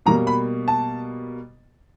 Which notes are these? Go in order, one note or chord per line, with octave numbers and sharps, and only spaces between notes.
B2 G3 A#3 A#5
B5
A5